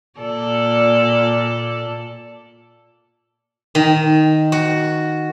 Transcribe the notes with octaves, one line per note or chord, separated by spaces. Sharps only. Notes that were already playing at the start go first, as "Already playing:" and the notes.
A#2 A4 D5
D#3
F#4